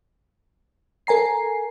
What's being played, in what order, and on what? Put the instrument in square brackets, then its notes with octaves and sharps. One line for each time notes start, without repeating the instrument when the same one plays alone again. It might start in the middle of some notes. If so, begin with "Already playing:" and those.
[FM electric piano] A4 A#4 G#5 A#5 C7